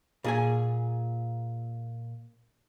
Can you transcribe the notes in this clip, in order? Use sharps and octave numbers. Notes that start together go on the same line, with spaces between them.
A#2 G#4 G#5